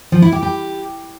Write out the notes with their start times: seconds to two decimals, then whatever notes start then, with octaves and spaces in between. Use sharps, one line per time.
0.12 F3
0.22 E4
0.32 G4
0.43 G4